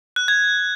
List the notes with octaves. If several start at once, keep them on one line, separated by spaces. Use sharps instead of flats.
F#6
G#6